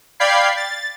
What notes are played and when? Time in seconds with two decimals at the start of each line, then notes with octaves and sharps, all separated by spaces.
0.20 D5 F5 G5 B5 G#6 C7
0.57 A6